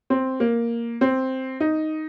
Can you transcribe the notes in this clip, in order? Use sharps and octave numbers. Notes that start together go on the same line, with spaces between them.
C4
A#3
C4
D#4